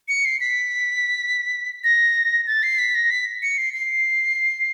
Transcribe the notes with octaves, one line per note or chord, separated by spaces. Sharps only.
C#7
C7
B6
A#6
A6
C7
B6
A#6
B6
C#7
C7
C7